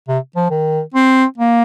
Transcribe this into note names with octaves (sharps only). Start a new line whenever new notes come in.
C3
F3
D#3
C4
A#3